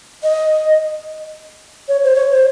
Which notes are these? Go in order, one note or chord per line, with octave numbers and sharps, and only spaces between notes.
D#5
C#5
C5
C#5
C5